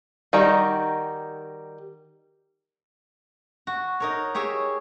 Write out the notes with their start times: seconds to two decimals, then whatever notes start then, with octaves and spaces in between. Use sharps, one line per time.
0.33 D#3 G3 D#4 F#4 A#5
3.67 F#4
4.00 D#4 A#4 C#5
4.35 G4 G#4 C#5 E5